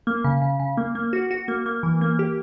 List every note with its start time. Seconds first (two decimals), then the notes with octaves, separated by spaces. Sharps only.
0.07 A#3
0.24 C#3
0.42 C#3
0.60 C#3
0.77 A#3
0.95 A#3
1.13 F#4
1.31 F#4
1.48 A#3
1.66 A#3
1.83 E3
2.01 A#3
2.19 G4